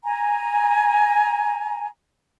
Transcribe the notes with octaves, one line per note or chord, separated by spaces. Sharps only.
G#5 A#5